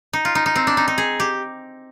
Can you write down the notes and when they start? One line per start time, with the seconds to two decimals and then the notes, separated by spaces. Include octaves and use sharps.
0.13 D#4
0.25 F4
0.35 D#4
0.46 D#4
0.55 C4
0.67 D4
0.77 D#4
0.88 D#4
0.98 G#4
1.20 G4